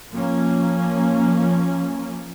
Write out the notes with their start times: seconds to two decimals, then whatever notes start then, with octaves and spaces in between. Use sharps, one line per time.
0.13 F3 A#3 C#4